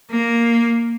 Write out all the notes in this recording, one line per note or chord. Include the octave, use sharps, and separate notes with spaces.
A#3